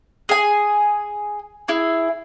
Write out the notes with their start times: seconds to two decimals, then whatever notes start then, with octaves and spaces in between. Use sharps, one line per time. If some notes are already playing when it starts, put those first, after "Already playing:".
0.29 G#4 G#5
1.68 E4 G#4